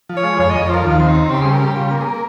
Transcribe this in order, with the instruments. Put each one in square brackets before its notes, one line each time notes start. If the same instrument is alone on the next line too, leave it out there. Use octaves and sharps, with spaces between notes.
[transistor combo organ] F3
[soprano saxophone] C#5
[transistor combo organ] G#3
[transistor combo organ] F2 [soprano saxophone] C#5
[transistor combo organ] F2 [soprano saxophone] D#5
[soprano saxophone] C#5
[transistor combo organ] F3 [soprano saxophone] C5
[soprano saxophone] A#4
[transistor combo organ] D#2 [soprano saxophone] F4
[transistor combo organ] C4
[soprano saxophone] D#4
[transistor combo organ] C4
[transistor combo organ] C#3 [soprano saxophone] G4
[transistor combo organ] G3 [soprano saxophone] G#4
[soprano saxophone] A#4
[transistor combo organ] G3 [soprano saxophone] G4
[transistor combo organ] C#3 [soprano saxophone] F4
[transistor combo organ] A#3
[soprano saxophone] G#4
[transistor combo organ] A#3 [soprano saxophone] A#4